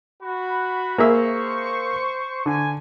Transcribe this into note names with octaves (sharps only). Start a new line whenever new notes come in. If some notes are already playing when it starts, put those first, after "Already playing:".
F#4 B5
A#3 G#4 C5 E5 C#6
D3 G#5